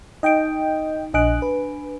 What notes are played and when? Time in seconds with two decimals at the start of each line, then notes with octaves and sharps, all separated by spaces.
0.23 D#4 D#5 G5 D7
1.13 A#1 D4 D#5 G#5 F#6 D7
1.42 B4